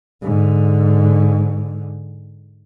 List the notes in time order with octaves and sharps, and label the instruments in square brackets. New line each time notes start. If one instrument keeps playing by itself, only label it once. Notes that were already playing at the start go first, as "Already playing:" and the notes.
[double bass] G#2 D3